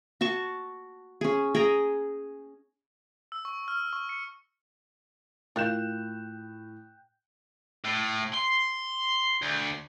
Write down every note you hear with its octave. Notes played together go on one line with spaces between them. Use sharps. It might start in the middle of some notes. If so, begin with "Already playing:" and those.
F#4 A5 C#6
C#4 G#4
G#4 G5 A#5
E6
C#6
F6
C#6
C#7
A2 F4 A#4 F5 G5 F#6 G6 E7
A2
C6
D2